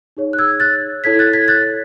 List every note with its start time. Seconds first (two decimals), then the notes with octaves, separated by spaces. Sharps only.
0.17 D#4 G#4 C#5
0.33 F#6
0.39 E6 G#6
0.60 F#6 A6
1.04 E4 A4 C#5 G#6 B6
1.19 F#6 A6
1.33 G#6 B6
1.48 F#6 A6